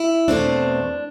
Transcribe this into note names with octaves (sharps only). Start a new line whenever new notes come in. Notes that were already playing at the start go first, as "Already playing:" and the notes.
Already playing: E4
E2 B2 A3 C4 D4